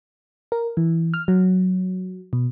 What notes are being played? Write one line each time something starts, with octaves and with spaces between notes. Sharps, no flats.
A#4
E3
F6
F#3
B2